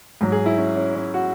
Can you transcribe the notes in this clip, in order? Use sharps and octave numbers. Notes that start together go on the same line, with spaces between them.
G#2 F#3
G#4
E4
C#4
C#4
C#4
F#4